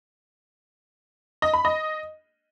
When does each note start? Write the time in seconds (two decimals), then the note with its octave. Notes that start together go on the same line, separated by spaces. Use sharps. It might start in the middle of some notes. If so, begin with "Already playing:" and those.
1.42 D#5
1.53 B5
1.65 D#5